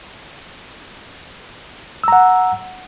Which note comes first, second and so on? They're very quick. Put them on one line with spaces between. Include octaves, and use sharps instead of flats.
E6 A#5 F#5